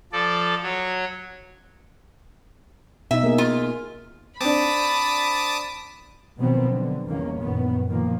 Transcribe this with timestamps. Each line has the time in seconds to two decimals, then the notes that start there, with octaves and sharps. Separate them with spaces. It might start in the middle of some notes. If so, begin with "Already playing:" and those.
0.13 F3 A4 D5
0.63 F#3 C#5
3.11 B2 D#4 E5
3.24 A#3 G#4
3.38 F4
4.41 C4 D4 A5 B5 D6 D#6
6.38 B2 D#3 F3 F#3 B3 C4
6.69 D3
7.06 G1 E2 D#3 A#3 C#4
7.40 A#1 F#2 D#3 B3
7.88 A#2 D#3 F3 A#3